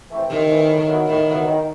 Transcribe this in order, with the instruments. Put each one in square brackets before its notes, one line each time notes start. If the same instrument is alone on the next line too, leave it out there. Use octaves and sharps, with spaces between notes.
[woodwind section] E3 A3 C4
[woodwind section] C3 [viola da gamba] D#3
[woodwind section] E3 A3 C4
A2
F#3 B3 E4
[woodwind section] A2 [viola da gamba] D#3
[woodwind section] F#3 B3 E4
D#3